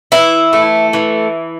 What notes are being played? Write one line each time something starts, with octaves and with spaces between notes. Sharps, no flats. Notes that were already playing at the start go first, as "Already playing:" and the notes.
E3 E4
A3
E3